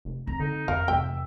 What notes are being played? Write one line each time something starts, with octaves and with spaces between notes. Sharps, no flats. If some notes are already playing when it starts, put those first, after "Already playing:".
F1
C4 A#5
D3 D#4
F#1 F2 A#4 F5
F1 E2 E5 G5